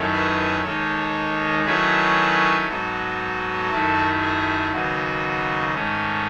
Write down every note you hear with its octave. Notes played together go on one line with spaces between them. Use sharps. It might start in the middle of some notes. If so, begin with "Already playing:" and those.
Already playing: F#2 D#3 A3 C#4 E4
G#4 B4
D#2 D#3 G#3 D#4 A4 C#5
D#3 F#3 A3 C#4 E4 G#4 B4
G#2 F#3 B3 D#4 F#4 A4
F#2 D#3 A3 E4
G#4
D#2 C#3 F#3 B3 D#4 F#4
G#2 D#3 A3 C#4